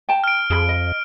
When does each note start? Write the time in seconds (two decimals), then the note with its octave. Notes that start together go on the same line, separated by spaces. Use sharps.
0.09 G5 A5
0.24 F6 D7
0.50 F2 G#4 B5
0.69 D#5